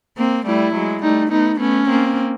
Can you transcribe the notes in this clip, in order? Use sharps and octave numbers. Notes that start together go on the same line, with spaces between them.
A#3 C4
G3 A3 E4
F#3 G#3
G3 A3 D#4
A3 B3 D#4
A3 B3 C#4
A#3 C4